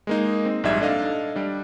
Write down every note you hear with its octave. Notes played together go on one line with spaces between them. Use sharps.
G#3 A#3 D#4
C4
A#1 G#2 G3 D#4 E5 G#6
D4 A4 D#5 F5
G3 D4